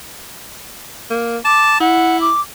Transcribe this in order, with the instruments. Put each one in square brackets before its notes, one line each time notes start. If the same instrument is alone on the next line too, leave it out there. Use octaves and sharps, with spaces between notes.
[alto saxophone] A#3
[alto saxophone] A5 [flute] D6
[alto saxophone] E4 [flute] F#5
[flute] D6